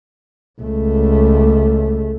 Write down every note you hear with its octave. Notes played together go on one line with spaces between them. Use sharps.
C#2 A3